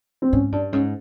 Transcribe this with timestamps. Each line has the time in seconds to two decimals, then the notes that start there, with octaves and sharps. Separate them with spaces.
0.22 C4
0.33 G#2 C#4
0.52 G2 D4
0.73 G#2 C#4